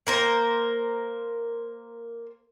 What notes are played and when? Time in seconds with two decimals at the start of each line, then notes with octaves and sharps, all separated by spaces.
0.07 A#3 A#4 C5